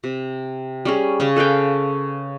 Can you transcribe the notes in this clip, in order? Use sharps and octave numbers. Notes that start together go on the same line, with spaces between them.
C3
G3 C#4 G#4
C#3 C#4
A4 B4 F5 G5